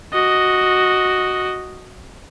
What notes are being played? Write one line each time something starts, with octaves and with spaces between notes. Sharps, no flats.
F#4 D#5